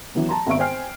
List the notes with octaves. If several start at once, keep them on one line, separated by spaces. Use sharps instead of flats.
E3 F#3 B3
A5 A#5 C6
G#1 B3 C4 E5 C#6 D7
C5 G5 G#5 F6 C7